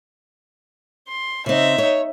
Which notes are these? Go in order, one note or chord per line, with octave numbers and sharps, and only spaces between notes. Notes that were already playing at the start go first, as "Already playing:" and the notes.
C6
C#3 C4 D#4 E5
C#5